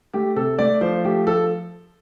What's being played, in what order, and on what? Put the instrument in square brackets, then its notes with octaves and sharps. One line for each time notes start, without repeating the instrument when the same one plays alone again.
[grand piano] A3 G4
C3 A4
A3 D5
F3 C5
A3 G4
F3 A4